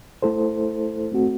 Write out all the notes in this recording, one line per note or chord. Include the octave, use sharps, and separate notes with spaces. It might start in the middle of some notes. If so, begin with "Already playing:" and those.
A3 E4 A4 C5
A3 C4 F#4